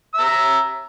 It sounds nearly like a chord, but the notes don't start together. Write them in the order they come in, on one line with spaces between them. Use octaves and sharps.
E6 E5 A#5